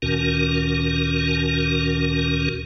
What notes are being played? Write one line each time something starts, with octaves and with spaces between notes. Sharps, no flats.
D2 A#2 D#3 C#4 F#4 A#4